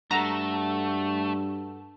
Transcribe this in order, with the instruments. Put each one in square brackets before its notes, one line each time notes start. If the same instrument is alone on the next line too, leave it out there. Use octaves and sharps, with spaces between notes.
[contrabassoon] G2 [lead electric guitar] A3 [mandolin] F#4 A4 [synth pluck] A#5